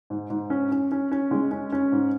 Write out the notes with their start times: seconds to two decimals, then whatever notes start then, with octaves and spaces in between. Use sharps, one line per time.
0.10 G#2
0.30 G#2
0.50 C#4
0.72 C#4
0.92 C#4
1.12 C#4
1.31 G#3
1.51 C#4
1.72 C#4
1.92 G#2